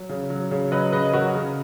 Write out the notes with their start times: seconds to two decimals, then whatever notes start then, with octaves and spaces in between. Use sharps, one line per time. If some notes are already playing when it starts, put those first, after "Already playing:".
Already playing: F#3
0.09 C#3
0.30 F#3
0.51 C#3
0.72 F#3 B4 D#5
0.92 C#3 B4 D#5
1.13 F#3 F#4 A#4
1.35 C#3